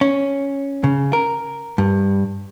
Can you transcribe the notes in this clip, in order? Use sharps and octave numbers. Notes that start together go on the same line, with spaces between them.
C#4
C#3
A#4
G2